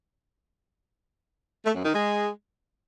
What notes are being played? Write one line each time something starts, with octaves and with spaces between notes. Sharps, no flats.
A3
F#2
D#3
G#3